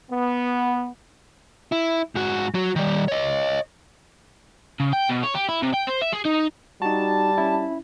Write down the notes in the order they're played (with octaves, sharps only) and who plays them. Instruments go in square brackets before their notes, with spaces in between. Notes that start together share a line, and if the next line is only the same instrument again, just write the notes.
[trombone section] B3
[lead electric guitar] E4
G#2 F#4
F#3 F#4
D#3 G3
C#5 D#5
[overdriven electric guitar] C#3
G5
B2
C#5
G4
E4
C3
G5
C5
E5
G#4
D#4
[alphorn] G3 [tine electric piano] D#4 F#4 [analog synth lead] A5
[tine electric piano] C#4 E4